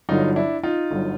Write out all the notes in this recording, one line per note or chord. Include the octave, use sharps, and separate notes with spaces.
G1 G2 D3 F#3 D#4 F4
D4 E4
D#4 F4
G1 G2 D3 F#3